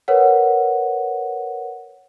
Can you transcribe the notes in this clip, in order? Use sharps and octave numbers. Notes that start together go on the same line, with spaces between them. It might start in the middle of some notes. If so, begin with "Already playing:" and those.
A#4 B4 C#5 F#5